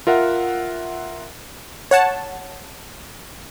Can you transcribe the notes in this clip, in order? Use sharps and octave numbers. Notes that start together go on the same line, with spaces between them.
F4 A#4 E5 F#5
C#5 F#5 A5